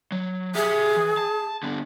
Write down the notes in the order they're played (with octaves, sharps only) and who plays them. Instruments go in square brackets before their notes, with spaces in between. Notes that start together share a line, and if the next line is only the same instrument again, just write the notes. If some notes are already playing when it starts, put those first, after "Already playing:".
[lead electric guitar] F#3
[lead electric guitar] G4 E5 [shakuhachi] G#4
[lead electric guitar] E3
A5
D3 B3